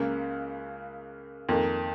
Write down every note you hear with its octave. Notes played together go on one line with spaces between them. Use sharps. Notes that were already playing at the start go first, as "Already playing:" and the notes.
Already playing: C#2 C#3 A#3
F2 D#3 A#3